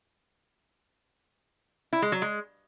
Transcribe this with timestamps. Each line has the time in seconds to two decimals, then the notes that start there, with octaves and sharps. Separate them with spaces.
1.93 E4
2.02 G#3
2.12 F#3
2.22 G#3